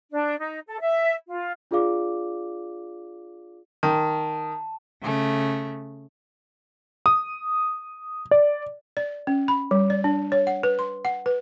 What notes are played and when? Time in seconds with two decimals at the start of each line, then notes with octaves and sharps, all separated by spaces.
0.12 D4
0.40 D#4
0.68 A4
0.80 E5
1.29 F4
1.71 D4 F4 G#4 D5 F5 D6
3.83 D#3 A5
5.00 C#3 A3
7.06 D#6
8.31 D5
8.97 D5
9.27 C#4
9.48 B5
9.71 G3
9.90 D5
10.04 D4
10.32 C#5
10.47 F#5
10.63 B4
10.79 C6
11.05 F#5
11.26 B4